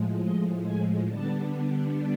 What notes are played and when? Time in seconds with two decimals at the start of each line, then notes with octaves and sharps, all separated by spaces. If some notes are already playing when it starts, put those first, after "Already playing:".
Already playing: A2 F3 G#3
0.21 D#5
0.64 G#5
1.06 D3 G3 B3 D4 A5